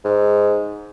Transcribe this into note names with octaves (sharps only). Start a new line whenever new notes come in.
G#2